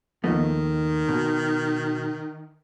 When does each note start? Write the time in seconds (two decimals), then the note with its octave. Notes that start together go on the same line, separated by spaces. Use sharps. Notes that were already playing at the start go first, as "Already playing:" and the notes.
0.24 D#2 D#3 F3 A3 B3 D#5
1.09 B2